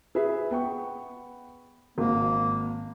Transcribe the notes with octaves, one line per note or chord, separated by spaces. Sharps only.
G#4 B4 E5
B3 G5 C#6
G#1 A#3